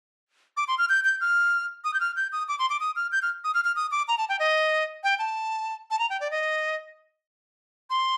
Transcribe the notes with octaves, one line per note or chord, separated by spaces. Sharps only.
D6
C6
F6
G6
G6
F6
D#6
G6
F6
G6
D#6
D6
C6
D6
D#6
F6
G6
F6
D#6
F6
F6
D#6
D6
A#5
A5
G5
D#5
G5
A5
A5
A#5
G5
D5
D#5
C6